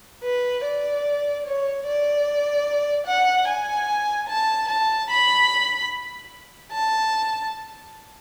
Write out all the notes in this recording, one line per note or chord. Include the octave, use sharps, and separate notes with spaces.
B4
D5
C#5
D5
F#5
G#5
A5
A5
B5
A5